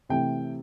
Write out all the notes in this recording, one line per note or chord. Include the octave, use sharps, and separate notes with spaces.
C3 E3 A3 G5